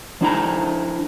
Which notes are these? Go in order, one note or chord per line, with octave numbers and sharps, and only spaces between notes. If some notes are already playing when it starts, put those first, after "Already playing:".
F3 D4 E4 A#5